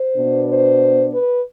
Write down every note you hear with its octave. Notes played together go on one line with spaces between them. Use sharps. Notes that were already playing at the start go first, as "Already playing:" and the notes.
Already playing: C5
B2 B3 D4
C5
B4